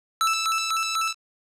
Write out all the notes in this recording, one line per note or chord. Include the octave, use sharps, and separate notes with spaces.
E6